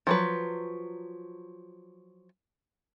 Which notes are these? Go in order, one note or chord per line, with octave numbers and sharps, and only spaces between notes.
F3 F#3 B4